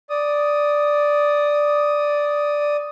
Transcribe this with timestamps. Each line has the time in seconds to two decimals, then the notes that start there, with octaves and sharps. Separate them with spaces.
0.10 D5 D#6